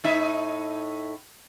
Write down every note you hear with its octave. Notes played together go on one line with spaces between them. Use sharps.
A2 D#4 E5